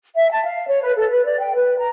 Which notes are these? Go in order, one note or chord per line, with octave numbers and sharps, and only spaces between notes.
E5
A5
F5
C#5
B4
A4
B4
D5
G5
B4
A#5